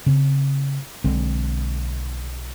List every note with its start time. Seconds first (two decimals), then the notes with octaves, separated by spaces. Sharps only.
0.06 C#3 C4
1.04 B1 D3 G#3 C4